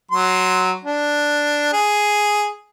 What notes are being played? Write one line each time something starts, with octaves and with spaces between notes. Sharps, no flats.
F#3 C6
D4
G#4